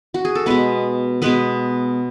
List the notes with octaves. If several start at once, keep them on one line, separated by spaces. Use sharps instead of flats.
F#4
G#4
A4
B2 G#3 B3 B4
B2 G#3 B3 B4